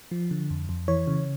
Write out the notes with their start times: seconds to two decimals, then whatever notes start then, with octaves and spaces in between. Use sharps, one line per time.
0.11 F3
0.31 D3
0.50 F2
0.69 F2
0.88 E3 C#5
1.07 C#3